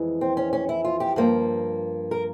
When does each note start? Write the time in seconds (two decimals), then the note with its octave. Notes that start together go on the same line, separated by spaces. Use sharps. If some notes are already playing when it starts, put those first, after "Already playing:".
Already playing: F2 E3 G#3
0.21 C4
0.37 C#4
0.53 C#4
0.69 E4
0.85 F4
1.00 G4
1.16 G2 F3 A#3
2.11 A#4